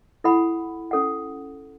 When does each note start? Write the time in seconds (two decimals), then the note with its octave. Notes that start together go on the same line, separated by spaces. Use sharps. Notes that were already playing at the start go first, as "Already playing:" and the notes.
0.24 E4 A4 F#5 B5
0.91 C#4 A4 F#5